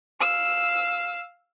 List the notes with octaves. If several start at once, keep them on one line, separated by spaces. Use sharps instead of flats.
F5 E6